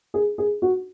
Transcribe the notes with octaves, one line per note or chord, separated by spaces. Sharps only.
G#4
G#4
F#4